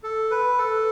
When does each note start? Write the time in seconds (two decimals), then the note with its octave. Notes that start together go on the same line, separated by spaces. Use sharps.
0.03 A4
0.31 B4
0.58 A4